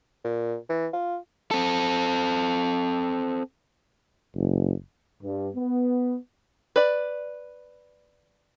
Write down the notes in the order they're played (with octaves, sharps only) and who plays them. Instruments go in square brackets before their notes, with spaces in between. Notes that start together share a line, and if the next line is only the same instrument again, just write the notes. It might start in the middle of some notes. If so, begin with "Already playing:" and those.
[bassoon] A#2
E3
F4
[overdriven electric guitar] C4 A4
[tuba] F#1
[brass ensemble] G2
B3
[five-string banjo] B4 D5